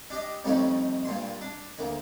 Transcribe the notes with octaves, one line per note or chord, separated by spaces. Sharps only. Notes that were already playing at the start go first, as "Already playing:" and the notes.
D4 G4 D#5
F2 G3 A3 C#4 D#4
G2 A#2 C6
D4
D2 A#3